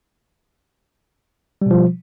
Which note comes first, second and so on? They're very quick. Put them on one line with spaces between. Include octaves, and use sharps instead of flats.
G3 B2 F3